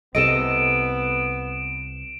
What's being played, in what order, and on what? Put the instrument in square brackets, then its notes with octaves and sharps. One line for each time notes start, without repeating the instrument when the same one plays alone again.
[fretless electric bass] C2 C3 [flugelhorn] B3 [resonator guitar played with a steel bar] A4 D#5 [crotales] D7 E7